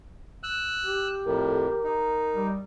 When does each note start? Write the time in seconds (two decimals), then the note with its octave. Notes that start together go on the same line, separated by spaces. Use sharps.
0.43 E6 F#6
0.84 G4
1.25 F2 A2 A#4
1.84 D#4
2.33 G3